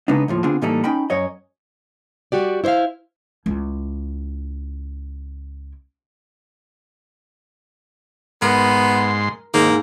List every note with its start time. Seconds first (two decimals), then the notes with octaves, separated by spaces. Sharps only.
0.08 C#3 G#3 B3 D4 D#4
0.28 D#2 A2 F3
0.44 D3 B3 C4 D4 F4 G#4
0.62 A2 E3 G3 A#3 D#4 A4
0.84 C#4 D#4 G5 B5
1.10 F#2 C#5 D#5
2.32 G3 F#4 G4 D5
2.64 E4 C5 C#5 E5 F5
3.46 C#2 E4
8.42 G#2 B3 A#4 C6
9.54 G#2 D#3 A#3